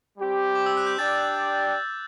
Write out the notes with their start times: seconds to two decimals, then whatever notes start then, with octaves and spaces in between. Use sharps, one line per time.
0.18 G3 C4 G4
0.55 D6
0.66 E6
0.77 F#6
0.87 G6
0.98 D4 G4 D5 G5 A6